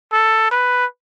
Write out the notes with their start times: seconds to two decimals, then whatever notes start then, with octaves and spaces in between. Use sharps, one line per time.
0.12 A4
0.51 B4